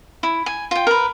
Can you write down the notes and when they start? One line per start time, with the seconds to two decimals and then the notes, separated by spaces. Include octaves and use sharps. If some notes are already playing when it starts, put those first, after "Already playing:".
0.23 E4
0.46 G#5
0.71 F4 G5
0.87 A#4 B4